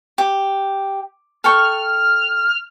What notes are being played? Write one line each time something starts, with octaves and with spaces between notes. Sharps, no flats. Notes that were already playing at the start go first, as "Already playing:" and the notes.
G4
A4 G5 C#6 F6